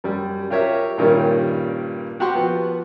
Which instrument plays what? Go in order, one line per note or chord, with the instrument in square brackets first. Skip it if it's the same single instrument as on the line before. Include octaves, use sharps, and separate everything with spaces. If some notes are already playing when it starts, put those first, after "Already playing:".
[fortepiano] F#2 G3
F4 G4 A#4 C#5 E5
G2 A#2 D#3 G3 C#4
F#4 G4 F#5 G5 C6 C#6
F3 B3